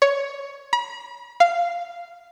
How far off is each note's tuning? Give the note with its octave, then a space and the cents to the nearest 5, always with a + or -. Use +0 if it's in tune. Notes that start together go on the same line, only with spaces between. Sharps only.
C#5 +10
B5 -45
F5 -10